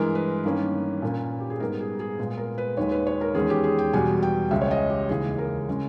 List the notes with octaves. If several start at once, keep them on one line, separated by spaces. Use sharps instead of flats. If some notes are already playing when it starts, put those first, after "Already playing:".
Already playing: G2 E3 G#3 A#4
B4
G2 D#3 A#3 C#4
A#2 A#3 C#4
G4
G#4
G#2 G3 B3 A#4
G#4
G#4
A#2 G#3 B3
A#4
B4
D#2 D#3 G#3 C#5
B4
C#5
A#4
E2 D#3 G#3 C#4 G#4
G4
G#4
G5
E2 B2 G3 G#5
G5
C#2 C#3 G#3 C#4 E5
C#5
D#5
G4
D#2 C#3 E3 G#3 C#4 G#4
A#4
C#3 G#3 C#4